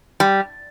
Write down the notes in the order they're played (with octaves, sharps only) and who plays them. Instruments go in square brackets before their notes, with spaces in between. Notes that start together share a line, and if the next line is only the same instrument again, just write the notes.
[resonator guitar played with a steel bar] G3